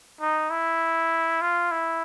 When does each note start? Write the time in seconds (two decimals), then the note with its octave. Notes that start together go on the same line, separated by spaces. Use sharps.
0.21 D#4
0.51 E4
1.41 F4
1.71 E4